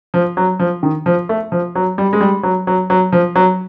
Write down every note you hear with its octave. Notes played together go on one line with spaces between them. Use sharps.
F3
F#3
F3
D#3
F3
A3
F3
F#3
G3
G#3
G3
F#3
F#3
F#3
F3
F#3